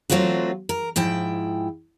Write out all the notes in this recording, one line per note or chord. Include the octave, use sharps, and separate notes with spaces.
F#3 A3 C4 F4 F#4
A#4
G#2 F3 E4 G5